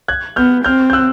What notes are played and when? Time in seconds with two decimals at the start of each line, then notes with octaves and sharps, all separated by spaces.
0.08 F#6 G#6
0.36 B3 F6 G6
0.64 C4 F6 G6
0.90 G6
0.93 E6 F#6